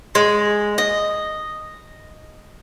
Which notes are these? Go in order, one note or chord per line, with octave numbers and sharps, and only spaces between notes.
G#3
D#5